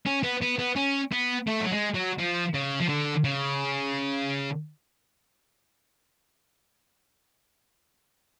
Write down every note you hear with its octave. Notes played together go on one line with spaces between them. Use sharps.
C#4
B3
B3
B3
C#4
B3
A3
F#3
G#3
F#3
F3
C#3
F3
D3
C#3